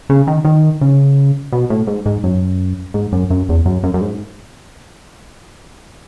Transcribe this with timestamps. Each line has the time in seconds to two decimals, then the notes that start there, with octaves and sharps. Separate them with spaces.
0.09 C#3
0.27 D#3
0.45 D#3
0.81 C#3
1.52 B2
1.70 A2
1.87 G#2
2.06 G#2
2.24 F#2
2.94 G#2
3.12 F#2
3.30 F#2
3.49 E2
3.66 F#2
3.84 F#2
3.94 F#2
4.01 G#2